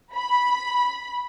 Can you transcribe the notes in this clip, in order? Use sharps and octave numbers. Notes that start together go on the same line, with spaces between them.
B5